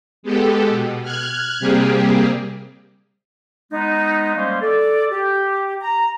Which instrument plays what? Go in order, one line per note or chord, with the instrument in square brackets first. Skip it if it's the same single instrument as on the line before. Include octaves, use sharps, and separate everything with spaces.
[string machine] G#3 B3 G4 A4
B2
F6 F#6 G#6
C3 G3 A#3 G4 G#4
[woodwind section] G#3 B3 D#4
G3 G#3 A#3 C#4 C5 F5
A4 D5
G4
A#5